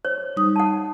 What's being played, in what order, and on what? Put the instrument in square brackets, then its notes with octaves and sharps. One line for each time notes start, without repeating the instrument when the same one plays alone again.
[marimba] C5 [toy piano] C#5
[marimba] G3 D#4 D#6
[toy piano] F#5 A5